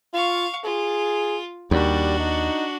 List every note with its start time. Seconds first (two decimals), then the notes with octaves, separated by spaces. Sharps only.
0.14 F4 F5 C#6
0.65 F4 G#4
1.71 D#2 G3 D4 F#4
2.19 D#4